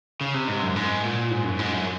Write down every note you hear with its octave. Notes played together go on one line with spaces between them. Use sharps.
C#3
C3
G#2
F#2
G#2
A#2
G#2
F#2
G#2
F#2